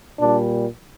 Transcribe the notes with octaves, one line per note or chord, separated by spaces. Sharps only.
A#2 G3 D4